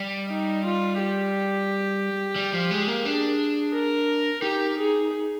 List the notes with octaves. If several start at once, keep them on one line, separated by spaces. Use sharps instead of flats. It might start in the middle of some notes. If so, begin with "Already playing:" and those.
Already playing: G3
D#4
F4
G4
G3
F3
G#3
A#3
D4 G#4
A#4
D#4 G4
G#4